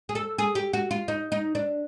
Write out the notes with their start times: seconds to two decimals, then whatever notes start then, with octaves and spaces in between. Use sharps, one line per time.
0.09 G#4
0.15 A4
0.38 G#4
0.55 G4
0.73 F#4
0.91 F4
1.08 D#4
1.32 D#4
1.55 D4